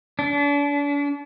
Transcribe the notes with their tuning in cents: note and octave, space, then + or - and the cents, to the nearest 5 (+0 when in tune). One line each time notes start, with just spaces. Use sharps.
D4 -40